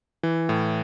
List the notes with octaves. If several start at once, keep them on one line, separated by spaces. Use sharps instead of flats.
E3
A2